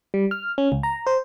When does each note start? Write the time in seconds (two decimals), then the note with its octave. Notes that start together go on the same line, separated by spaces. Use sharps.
0.14 G3
0.31 F6
0.58 C#4
0.72 C#2
0.83 A#5
1.07 C5